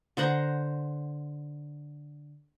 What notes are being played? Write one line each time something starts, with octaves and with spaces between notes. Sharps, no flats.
D3 C5 F#5 A#5